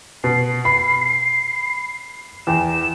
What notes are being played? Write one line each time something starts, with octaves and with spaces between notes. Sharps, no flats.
B2 C7
B5
E2 G5 E7